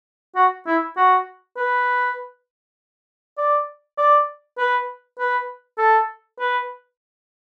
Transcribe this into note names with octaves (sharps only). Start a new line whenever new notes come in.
F#4
E4
F#4
B4
D5
D5
B4
B4
A4
B4